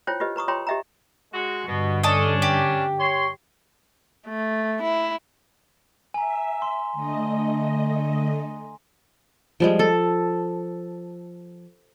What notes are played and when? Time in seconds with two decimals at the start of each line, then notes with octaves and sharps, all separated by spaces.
0.07 E4 F4 C5 C#5 G5
0.20 F4 G4 B4 D#5
0.36 B4 A#5 C#6 D#6
0.48 F4 C#5 G5 A#5 C6 C#6
0.67 G4 D#5 E5 G5 A#5
1.33 G#3 F#4
1.67 G2 B2 D3
2.03 C#4 D4 A4 D#5
2.42 G4
2.99 C#5 C6
4.27 A3
4.82 E4
6.14 E5 G#5 A#5
6.62 C6
6.93 D3 A3 D#5
9.60 F3 G3 G#3
9.79 A4